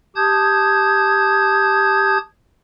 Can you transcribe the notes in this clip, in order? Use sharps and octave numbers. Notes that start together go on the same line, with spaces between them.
G4 A5 D#6 G6 G#6